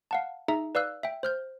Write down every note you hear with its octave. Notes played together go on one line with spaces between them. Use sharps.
F5 F#5 A5
D#4 G#4 E5 A#5
B4 D5 F5 E6 F#6
E5 G5
C5 F6 G6